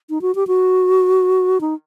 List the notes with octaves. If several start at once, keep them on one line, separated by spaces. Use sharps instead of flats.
D#4
F#4
G4
F#4
D#4